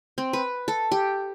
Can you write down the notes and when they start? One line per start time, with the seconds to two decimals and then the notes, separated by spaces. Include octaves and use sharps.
0.18 C4
0.33 B4
0.68 A4
0.92 G4